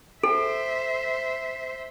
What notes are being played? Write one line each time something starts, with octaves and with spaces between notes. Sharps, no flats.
A4 C5 E5